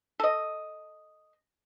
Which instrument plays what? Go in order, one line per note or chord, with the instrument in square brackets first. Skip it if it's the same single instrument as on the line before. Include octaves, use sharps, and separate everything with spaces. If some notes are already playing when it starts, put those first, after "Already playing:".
[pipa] A4 D#5